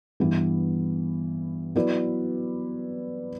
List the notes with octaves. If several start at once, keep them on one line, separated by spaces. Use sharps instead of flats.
G2 E3 B3 E4
F#3 B3 E4 B4 D5